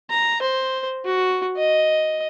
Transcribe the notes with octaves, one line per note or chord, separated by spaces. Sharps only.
A#5
C5
F#4
D#5